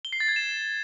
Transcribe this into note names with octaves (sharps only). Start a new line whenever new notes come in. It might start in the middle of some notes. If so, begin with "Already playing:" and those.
G7
C7
A6
G#6
E7